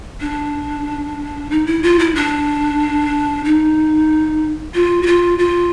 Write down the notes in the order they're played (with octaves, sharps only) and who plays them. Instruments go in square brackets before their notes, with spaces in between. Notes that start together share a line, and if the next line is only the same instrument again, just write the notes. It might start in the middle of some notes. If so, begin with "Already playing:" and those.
[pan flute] D4
D#4
E4
F4
E4
D4
D#4
F4
F#4
F4
F4